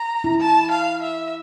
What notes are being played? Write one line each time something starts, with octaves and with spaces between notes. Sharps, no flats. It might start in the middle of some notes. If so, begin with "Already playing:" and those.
Already playing: A#5
E4
A5
F5
E5